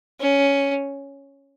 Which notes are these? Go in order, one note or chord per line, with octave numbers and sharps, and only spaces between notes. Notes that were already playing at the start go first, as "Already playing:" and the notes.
C#4